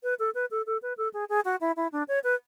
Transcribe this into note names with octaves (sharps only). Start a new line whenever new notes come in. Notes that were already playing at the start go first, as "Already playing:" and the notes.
B4
A4
B4
A4
A4
B4
A4
G#4
G#4
F#4
E4
E4
D4
C#5
B4